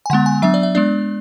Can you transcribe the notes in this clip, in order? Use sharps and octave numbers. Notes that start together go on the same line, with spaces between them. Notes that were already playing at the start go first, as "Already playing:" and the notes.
G#5
D3 G#3 B3 F#5
G#5
F#3 B3 D4 E5
D5
E5
G#3 B3 D4 D5